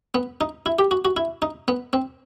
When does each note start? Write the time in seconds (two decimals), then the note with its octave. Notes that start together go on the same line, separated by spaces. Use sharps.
0.15 B3
0.41 D#4
0.66 E4
0.79 G4
0.91 F#4
1.05 F#4
1.17 E4
1.42 D#4
1.68 B3
1.93 C4